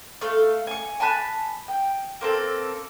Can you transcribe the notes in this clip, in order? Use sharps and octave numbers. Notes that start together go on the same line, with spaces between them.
A3 F5
G#5 C#6
G#5 A5 B5 F#6
G5
A#3 C4 A4